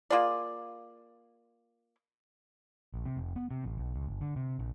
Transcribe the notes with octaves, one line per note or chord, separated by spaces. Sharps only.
A#3 F4 G#4 D5
A#1
C3
F1
B3
C3
A1
B1
C#2
G1
D3
C3
A#1